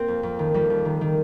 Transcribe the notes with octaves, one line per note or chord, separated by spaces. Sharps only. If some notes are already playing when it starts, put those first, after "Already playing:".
Already playing: A#3 C4
F2
F2
D#3
F2 G3
F2
D#3
D#3